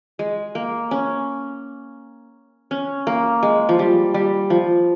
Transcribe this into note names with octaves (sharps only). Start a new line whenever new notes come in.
G#3
A#3
C#4
C#4
A#3
G#3
F3
G3
G3
F3